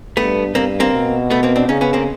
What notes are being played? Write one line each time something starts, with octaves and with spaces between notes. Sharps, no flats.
G2 A3 B3
G2 A#3 C4
A#3 C4
B2
A3 B3
A#3 C4
C4 D4
C#3 C#4 D#4
B3 C#4
A#3 C4